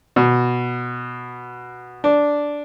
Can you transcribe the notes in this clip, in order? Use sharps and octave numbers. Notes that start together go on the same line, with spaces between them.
B2
D4